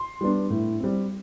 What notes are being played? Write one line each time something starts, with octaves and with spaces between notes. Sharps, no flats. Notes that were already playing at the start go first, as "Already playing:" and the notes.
Already playing: C6
G3 B3 D4
A2
G3 C4